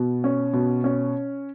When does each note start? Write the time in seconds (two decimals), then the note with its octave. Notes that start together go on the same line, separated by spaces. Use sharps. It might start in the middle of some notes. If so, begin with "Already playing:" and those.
Already playing: B2
0.24 C#4
0.53 B2
0.84 C#4